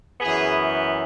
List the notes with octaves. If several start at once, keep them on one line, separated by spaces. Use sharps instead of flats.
F#2 E3 B3 G#4